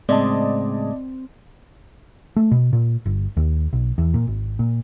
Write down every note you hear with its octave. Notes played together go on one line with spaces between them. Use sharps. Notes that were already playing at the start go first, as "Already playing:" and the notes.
A2 C#3 G#3 C4 D5 D#5 A5
A3
B2
A#2
G1
D#2
B1
E2
A#2
G#1
A#2